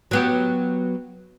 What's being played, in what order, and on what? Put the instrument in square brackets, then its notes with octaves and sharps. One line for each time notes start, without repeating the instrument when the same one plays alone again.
[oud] F#3 B3 G4